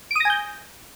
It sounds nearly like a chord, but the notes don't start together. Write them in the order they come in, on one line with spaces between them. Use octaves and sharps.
D7 D#6 A#6 G#5 G6